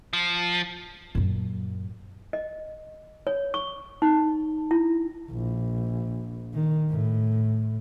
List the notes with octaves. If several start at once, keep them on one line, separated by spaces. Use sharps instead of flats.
F3
F#2 A#2
D#5
C#5
C#6
D#4
E4
A#1
D#3
A2